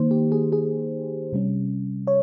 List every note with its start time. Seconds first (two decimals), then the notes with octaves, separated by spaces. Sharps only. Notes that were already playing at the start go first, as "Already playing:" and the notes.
Already playing: D#3 A#3 D#4 C5
0.11 G4
0.32 G#4
0.52 G#4
1.33 C3 G3 C#4
2.07 C#5